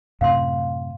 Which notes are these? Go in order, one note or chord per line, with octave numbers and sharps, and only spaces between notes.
F#2 A2 C3 F5 C6